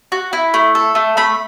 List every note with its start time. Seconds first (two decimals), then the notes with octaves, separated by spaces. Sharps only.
0.12 F#4
0.33 E4
0.54 A3
0.75 A4
0.95 A3
1.17 A3 B5